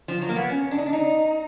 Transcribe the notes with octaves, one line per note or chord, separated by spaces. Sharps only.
F3
F#3
A#3
B3
C#4
D4
D#4
D4
D#4